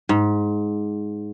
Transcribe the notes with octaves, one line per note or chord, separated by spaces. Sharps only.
G#2